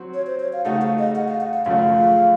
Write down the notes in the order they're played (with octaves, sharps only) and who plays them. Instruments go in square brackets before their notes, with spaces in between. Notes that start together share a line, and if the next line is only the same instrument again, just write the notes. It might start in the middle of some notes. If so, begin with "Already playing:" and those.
Already playing: [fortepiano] F#3 C4 F#4
[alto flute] C#5
C5
C#5
F5
[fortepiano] C#3 A3 D#4 [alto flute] F#5
[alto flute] F5
D#5
F#5
F5
F#5
F5
[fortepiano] F#2 C#3 F3 A3 [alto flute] F5